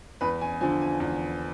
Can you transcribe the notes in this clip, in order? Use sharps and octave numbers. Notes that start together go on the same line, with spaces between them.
E2 B4
G#5
D3 F3 G#5
G#5
E2